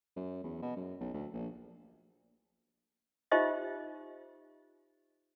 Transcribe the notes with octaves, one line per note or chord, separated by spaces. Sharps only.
F#2
E2
B2
F#2
B1
D2
A#1
D#4 F4 G4 C5 D#5 E5